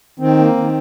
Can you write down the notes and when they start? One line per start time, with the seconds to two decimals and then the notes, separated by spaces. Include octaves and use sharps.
0.20 D#3 C4
0.39 A#3
0.57 D#3